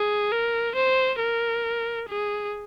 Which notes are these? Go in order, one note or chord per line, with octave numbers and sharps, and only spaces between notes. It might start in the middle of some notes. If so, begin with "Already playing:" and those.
Already playing: G#4
A#4
C5
A#4
G#4